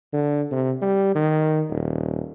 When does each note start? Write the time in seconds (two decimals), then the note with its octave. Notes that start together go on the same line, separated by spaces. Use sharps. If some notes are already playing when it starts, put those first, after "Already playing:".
0.13 D3
0.52 C3
0.82 G3
1.15 D#3
1.70 D#1